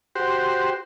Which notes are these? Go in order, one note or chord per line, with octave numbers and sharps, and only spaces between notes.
F#4 G4 C5